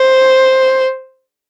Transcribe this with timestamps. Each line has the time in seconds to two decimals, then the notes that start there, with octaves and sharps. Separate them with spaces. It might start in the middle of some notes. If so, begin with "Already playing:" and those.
Already playing: C5